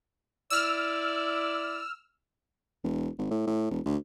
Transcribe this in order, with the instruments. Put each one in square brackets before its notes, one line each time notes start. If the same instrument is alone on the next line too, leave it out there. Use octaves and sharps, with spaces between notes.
[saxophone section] E4 D5 [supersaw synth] E6 F6
[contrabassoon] E1
G#1
A2
A2
E1
D2